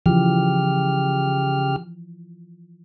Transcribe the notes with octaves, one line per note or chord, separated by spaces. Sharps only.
C#3 E3 F3 F4 G4 F6